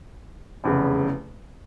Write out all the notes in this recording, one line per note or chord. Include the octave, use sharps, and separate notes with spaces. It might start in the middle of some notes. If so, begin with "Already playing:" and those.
F1 E2 C#3